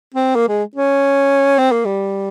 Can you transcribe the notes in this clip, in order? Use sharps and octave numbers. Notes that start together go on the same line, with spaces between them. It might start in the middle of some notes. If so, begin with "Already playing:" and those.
C4
A#3
G#3
C#4
C4
A#3
G3